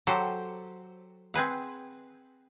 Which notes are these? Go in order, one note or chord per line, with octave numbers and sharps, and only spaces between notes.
F#3 G4 A4 C5
C4 G#4 B4 F#5